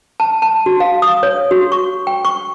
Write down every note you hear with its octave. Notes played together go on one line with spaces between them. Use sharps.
A5
A5
F#4
F5
D#6
C#5
F#4
C#6
G5
C#6